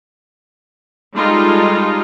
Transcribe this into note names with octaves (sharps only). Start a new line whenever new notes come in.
G3 G#3 D#4 F4 A4